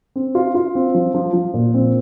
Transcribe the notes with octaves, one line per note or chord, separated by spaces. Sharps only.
C4
F4
F4
C4
F3
F3
F3
A#2
C4